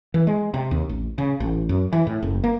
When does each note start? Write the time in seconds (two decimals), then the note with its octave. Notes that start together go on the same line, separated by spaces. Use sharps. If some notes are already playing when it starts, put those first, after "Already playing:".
0.14 E3
0.27 G#3
0.54 C3
0.71 D#2
0.89 A1
1.18 C#3
1.40 A1
1.69 F#2
1.93 E3
2.07 A2
2.22 F#1
2.44 A#3